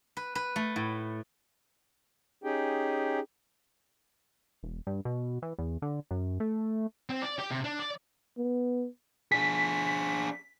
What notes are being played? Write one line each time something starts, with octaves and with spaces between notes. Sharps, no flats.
B4
B4
A3
A2
C#4 D#4 G4 G#4 G5
E1
G2
B2
E3
E2
D3
F#2
A3
C4
D5
G4
C3
D4
D5
B3
D4 G#4 B6